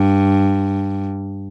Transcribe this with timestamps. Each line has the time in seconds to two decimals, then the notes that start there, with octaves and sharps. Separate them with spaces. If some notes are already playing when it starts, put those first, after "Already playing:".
Already playing: G2